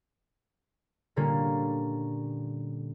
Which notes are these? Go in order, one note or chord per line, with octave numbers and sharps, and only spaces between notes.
A#2 D3 G3 A#3 C#4